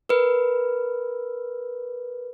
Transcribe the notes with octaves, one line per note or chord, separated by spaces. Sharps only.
A#4 B4